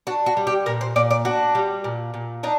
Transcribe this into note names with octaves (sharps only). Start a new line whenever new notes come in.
D4 F#4
F#4
G3
G4
A#2 A#4
C5
A#2 D5
D5
D4 F#4
G3
A#2
A#2
D4 D#4